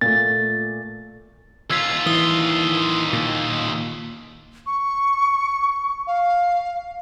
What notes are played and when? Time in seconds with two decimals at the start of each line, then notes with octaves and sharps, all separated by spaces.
0.01 A#2 A3 A6
1.70 D#2 F4 E6 G#6 B6
2.06 E3 D#6 G7
3.13 A#2
4.66 C#6
6.07 F5